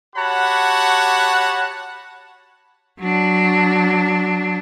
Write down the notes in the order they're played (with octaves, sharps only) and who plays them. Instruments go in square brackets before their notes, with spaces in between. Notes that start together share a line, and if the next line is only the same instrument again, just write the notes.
[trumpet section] F#4 G4 C#5 F#5 A5 B5
[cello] F#3 D4